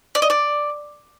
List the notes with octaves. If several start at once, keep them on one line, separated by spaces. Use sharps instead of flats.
D5
D#5
D5